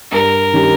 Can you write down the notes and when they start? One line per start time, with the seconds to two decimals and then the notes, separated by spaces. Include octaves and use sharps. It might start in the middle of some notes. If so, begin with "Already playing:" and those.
0.11 G2 A#4
0.53 D#3 G3 C#4 G4